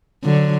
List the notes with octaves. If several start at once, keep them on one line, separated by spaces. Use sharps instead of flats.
D3 F#3